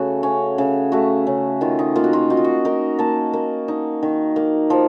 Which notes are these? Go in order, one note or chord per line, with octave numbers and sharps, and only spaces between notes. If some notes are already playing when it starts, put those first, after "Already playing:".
Already playing: C#3 A3 F#4 A4
C#4
C#3
A3 F#4
C#3
D#3 F4
D#4
A#3 F4
F#4
F4
D#4 F#4
F4
F#4
D#4 A#4
A#3 A5
A#3
D#4
D#3
A#3
F3